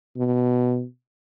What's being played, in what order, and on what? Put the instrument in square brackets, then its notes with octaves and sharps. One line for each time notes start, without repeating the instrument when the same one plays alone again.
[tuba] B2